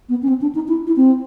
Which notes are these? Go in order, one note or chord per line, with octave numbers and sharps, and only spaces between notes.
B3
C#4
C4
D4
D#4
E4
E4
C4